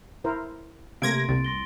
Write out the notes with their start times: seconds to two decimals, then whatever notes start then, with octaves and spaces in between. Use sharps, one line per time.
0.24 E4 A#4 C5
1.02 C3 A3 A#3 F5 C6 G#6 A#6 D7
1.29 C2 A6
1.45 C6 A#6 G7